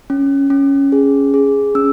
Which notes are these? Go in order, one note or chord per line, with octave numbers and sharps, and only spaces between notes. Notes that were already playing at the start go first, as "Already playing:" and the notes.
C#4
C#4
G#4
G#4
C#4 E6